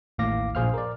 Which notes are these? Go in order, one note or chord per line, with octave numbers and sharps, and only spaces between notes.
A1 D#2 A2 F5 D6 A#6
A#1 A#2 G#4 C5 F5 F6
A#4 D5